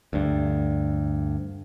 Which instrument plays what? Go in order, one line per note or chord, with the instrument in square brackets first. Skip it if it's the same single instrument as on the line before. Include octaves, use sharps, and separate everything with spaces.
[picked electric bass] D2 G2